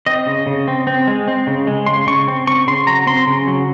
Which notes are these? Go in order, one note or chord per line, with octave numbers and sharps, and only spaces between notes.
C4 D#5
C#3
C#3
C4
C4
G#3
C4
C#3
G#3
C#3 C6
C#3 C#6
C4
C4 C#6
C#3 C6
F#3 A#5
C4 C6
C#3
F#3